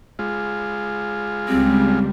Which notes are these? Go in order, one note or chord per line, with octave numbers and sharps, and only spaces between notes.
G#3 F4
C#2 G3 C4